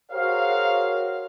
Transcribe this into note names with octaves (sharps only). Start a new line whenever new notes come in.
F#4 G#4 A#4 C5 C#5 F5